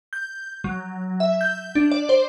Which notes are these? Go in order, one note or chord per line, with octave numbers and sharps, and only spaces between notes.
G6
F#3
E5
G6
D4
D5
C5